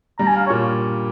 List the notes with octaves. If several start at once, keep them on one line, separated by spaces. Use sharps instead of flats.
G2 G3 A#5
G#5
F5
C#5
A#2